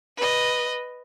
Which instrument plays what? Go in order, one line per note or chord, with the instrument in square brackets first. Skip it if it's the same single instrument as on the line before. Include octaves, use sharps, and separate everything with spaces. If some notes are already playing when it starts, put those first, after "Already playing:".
[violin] B4 D#5